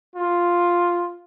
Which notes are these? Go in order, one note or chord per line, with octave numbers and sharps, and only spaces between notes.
F4